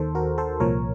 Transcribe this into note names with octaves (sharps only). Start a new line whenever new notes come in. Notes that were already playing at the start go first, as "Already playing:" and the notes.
Already playing: D#2 D#3 A4 C5
F#4 A#4
A4 C5
C2 A#2 F3 A#4 C#5